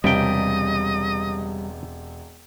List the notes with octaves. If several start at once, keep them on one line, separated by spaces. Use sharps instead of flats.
E1 C#2 C3 G3 D#5 G5 B6